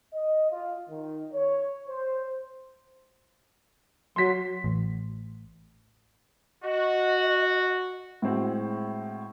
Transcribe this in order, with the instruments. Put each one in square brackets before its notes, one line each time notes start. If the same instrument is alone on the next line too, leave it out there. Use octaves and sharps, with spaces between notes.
[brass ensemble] D#5
F4
D#3
C#5
C5
[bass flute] F#3 [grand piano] C6 B6
[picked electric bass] A1
[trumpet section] F#4 [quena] D#5
[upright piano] A2 G#3 C4 F#4